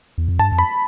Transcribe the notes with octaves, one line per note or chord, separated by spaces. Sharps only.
E2
F2
G2 A5
F2
B5